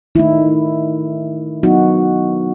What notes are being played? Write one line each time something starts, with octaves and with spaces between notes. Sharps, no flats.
D#3 A3 D#4 E4
F#3 B3 D#4 F#4